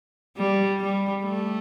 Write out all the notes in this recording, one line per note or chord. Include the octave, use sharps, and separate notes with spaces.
G3
G3
A3